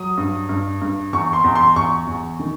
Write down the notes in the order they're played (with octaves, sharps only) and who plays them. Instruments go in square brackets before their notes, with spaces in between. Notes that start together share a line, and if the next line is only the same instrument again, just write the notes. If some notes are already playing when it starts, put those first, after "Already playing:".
Already playing: [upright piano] F#3 D#6
G2
G2
G2
E2 C#6
C6
E2
C6
E2 C#6
E2
D#3